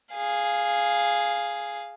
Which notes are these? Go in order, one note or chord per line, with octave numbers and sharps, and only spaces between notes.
G#4 F5